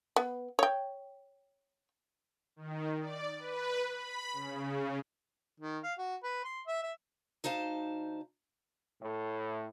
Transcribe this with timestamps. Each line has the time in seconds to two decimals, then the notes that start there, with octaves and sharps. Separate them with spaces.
0.16 B3
0.59 C#5 G5
2.56 D#3
3.00 D5
3.39 B4
3.89 B5
4.33 C#3
5.60 D#3
5.83 F5
5.98 F#4
6.23 B4
6.44 C6
6.67 E5
6.83 E5
7.44 D2 D#4 C5 F5 A5
9.01 A2